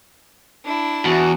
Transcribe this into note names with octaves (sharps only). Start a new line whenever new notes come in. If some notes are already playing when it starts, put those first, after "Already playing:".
D4 E4
E2 F#4